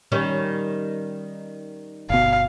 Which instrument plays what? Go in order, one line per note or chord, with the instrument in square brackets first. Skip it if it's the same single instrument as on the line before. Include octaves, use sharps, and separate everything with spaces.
[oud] D#3 G3 C#4
[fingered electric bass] G1 B2 [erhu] F5